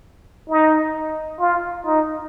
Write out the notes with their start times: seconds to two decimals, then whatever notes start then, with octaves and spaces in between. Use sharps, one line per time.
0.50 D#4
1.40 F4
1.86 D#4